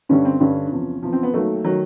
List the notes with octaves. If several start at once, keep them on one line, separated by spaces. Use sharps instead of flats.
G2 D3 G3 C#4
C4
G2 D3 G3 C#4
E2 C3 F3
E2 C3 F3
C4
B3
D#2 D#3 F#3 A3
D#3 F#3